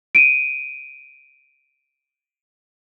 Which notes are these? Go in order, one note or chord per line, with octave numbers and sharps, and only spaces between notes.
D7 D#7